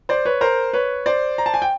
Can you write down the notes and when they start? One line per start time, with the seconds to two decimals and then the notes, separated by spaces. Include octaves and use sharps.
0.09 C5 D5
0.25 B4 C#5
0.41 A#4 C5
0.73 B4 C#5
1.06 C5 D5
1.38 A#5
1.46 A5
1.54 G#5
1.62 G5